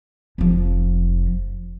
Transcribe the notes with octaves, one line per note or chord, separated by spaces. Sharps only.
F1 F3